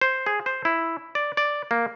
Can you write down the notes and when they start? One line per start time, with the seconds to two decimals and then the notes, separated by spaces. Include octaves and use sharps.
0.01 C5
0.26 G#4
0.46 C5
0.65 E4
1.15 D5
1.37 D5
1.71 A#3